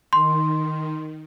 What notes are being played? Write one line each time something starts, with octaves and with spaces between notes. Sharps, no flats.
D#3 C6